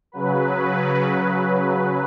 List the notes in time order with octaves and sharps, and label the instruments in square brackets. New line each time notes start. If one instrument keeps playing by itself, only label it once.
[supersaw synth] C#3 F#3 B4